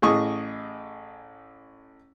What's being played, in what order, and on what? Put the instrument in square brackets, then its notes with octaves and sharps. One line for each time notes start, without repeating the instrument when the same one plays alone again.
[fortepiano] A1 A2 G#4 D#5 C#6 D#6